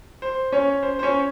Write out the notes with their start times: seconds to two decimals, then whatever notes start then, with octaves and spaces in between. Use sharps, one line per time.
0.22 C5
0.52 C#4 C#5
0.83 C5
0.99 C5
1.03 C#4 C#5